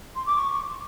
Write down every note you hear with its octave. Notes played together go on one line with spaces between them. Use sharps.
C6
D6
C#6